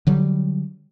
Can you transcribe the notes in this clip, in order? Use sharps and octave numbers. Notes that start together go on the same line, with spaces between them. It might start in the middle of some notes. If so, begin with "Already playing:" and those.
D3 F#3 G3